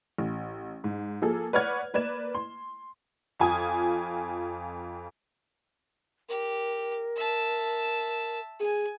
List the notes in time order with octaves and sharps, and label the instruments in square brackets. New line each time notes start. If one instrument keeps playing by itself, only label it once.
[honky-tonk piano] A1
G#2
F3 A#3 G#4 A4
B4 C#5 D5 F#5 F6 G#6
A#3 B4 D5 G#6 E7
C6
F2 F4 G#5 D#6
[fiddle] G4 [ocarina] A#4
[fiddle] E5 A5
[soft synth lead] G#4 [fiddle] G#5